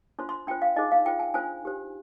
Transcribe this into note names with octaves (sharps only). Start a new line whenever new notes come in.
D4 F4 C5 C6
C6
D4 F4 C5 G5
F5
D#4 G#4 C5 D#5
F5
F4 C5 G5
G#5
D4 F4 C5 G#5
D#4 G4 C5